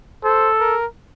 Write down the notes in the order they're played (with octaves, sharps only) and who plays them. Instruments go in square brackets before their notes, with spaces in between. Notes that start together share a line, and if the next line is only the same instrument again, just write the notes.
[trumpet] A4 [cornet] C5
[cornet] A#4